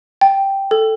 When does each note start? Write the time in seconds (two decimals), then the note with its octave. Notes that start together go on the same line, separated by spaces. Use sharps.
0.21 G5
0.71 A4